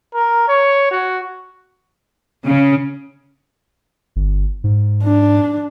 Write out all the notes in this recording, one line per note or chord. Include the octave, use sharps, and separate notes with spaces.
A#4
C#5
F#4
C#3
G1
G#2
D4